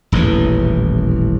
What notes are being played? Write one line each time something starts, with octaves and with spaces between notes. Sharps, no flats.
D#1 A1 E2 E3